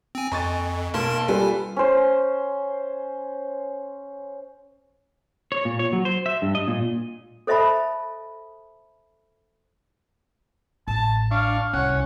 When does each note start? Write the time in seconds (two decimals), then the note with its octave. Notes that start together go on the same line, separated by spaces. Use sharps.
0.15 C4 G#5
0.32 F2 D#5 G#5 C#6 A6
0.94 B1 A#3 A#4 A5 C6
1.28 G3 F4 A4 B4 G#5
1.76 C#4 C5
5.52 C#5
5.65 A#2
5.79 C#5
5.93 F#3
6.05 C5
6.26 E5
6.42 G2
6.55 D#5
6.68 A#2
7.47 A4 C5 D#5 E5 A5 B5
10.88 A1 A5
11.31 D4 F5 C#6
11.73 C2 C#4 F#5